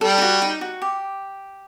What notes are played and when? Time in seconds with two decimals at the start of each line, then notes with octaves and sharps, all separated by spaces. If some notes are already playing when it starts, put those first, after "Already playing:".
0.01 G3 A4
0.18 D#4
0.22 F#4
0.42 D#4
0.61 F#4
0.82 G4